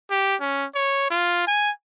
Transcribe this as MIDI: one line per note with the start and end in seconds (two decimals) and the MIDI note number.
0.11 0.35 67
0.41 0.66 61
0.75 1.09 73
1.10 1.46 65
1.47 1.71 80